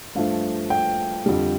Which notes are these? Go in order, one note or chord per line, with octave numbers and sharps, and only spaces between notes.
G2 F3 A3 F5
G5
F2 D3 G3